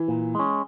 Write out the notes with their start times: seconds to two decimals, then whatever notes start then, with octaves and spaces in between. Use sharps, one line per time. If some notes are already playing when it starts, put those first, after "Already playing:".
Already playing: E3
0.08 A#2
0.35 G#3 C#4